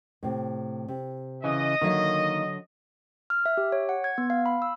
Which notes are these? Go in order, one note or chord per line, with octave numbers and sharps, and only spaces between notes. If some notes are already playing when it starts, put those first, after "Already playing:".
A2 C3
C3
C#3 E3 D#5
D3 D#3 F#3 A#3 E5
F6
E5
G4
C#5
F#5
G#6
B3
F5
B5
E6